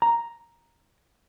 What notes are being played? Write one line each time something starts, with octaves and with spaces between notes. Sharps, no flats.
A#5